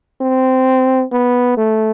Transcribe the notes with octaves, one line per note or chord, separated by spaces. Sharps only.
C4
B3
A3